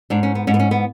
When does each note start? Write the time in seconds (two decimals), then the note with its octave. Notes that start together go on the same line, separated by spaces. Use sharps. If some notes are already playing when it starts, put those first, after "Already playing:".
0.10 G#2 D4
0.23 C#4
0.35 B3
0.47 G#2 C#4
0.54 B3
0.59 C#4
0.71 B3